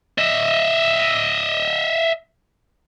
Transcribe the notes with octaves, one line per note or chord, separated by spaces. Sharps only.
D#5 E5